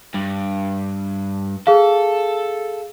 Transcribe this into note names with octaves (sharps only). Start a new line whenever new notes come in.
G2
G#4 A4 F5